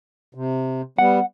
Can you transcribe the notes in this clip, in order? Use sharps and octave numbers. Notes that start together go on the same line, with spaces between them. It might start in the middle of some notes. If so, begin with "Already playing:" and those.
C3
G3 B3 F#5